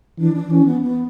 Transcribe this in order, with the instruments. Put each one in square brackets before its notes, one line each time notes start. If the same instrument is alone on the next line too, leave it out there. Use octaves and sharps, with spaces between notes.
[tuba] E3 [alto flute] D4
[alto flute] D4
[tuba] E3 [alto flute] C#4
[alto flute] B3
B3